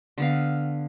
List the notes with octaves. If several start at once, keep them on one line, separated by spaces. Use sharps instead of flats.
D3 B3 F5